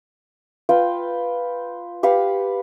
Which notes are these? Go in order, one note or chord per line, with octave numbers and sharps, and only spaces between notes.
F4 B4 F5 G5
G4 B4 F5 F#5